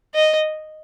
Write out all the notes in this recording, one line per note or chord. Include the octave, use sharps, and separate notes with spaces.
D#5